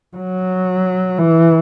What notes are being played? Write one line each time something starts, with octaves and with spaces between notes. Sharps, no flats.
F#3
E3